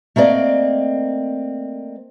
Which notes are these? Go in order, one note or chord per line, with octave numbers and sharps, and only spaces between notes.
A3 A#3 C4 D5 D#5